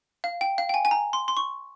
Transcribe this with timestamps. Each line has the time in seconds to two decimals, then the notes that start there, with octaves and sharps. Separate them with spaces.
0.24 F5
0.41 G5
0.58 F5
0.69 G5
0.74 G#5
0.85 G#5
0.91 A#5
1.13 C6
1.28 C6
1.37 C#6